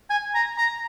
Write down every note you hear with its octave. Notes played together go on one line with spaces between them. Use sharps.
G#5
A#5
A#5